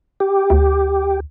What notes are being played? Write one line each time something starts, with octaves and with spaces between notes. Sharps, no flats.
G4
D2